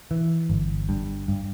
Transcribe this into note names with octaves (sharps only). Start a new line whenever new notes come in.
E3
G1
G2
G2